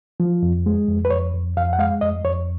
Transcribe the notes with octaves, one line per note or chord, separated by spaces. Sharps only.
F3
F2
G#3
F2
B4
F2 C#5
F2
F2 F5
F#5
G#3 F5
F2 D#5
F2 C#5